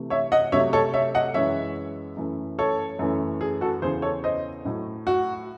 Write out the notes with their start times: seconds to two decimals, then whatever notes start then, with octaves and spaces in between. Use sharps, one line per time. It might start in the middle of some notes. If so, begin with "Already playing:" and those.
Already playing: C3 E3 A3
0.10 C#5 E5
0.32 D#5 F#5
0.52 C3 F#3 A3 C#5 E5
0.73 A4 C#5
0.94 C#5 E5
1.14 D#5 F#5
1.34 F#2 E3 G#3 C#5 E5
2.17 F#2 E3 A3
2.59 A4 C#5
2.99 F#2 E3 A3
3.41 G#4
3.61 F#4 A4
3.82 E2 C#3 E3 G#4 C5
4.02 A4 C#5
4.24 C5 D#5
4.65 A2 F#3 A3
5.07 F#4